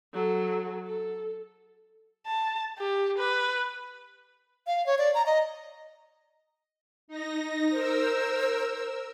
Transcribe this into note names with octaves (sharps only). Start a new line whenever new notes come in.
F#3 A4
A4
A5
G4
B4
F5
C#5
D5
A#5
D#5
D#4 A#6
A#4 C5 E6